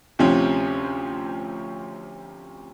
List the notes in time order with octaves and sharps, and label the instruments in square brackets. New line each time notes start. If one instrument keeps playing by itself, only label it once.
[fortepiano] D2 C3 F3 C4 C#4